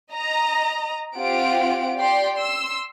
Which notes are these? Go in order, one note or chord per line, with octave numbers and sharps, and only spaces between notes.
D#5 A#5
C4 F4 G4 F#5 D7
G4 D5 G5 C6
C6 E6